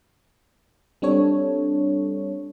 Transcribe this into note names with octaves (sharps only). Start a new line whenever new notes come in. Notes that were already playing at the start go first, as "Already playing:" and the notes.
G3 C4 D4 A4 C#5